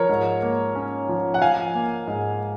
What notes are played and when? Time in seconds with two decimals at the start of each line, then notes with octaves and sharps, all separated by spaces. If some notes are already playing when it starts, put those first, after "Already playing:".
Already playing: F3 A#4 C#5
0.09 G#2
0.42 A#3
0.75 C#4
1.09 F3
1.34 F#5
1.42 F3 F5 G#5
1.75 A#3
2.07 G#2